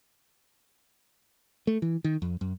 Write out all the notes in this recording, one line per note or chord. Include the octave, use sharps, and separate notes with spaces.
A3
E3
D#3
F2
F#2